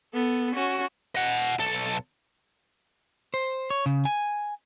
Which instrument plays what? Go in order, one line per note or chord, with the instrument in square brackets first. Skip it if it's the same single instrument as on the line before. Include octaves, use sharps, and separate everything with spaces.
[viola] B3 A4
C#4 F#4
[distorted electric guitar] D#5 F#5
B1 A4
[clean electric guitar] C5
C#5
C#3
G#5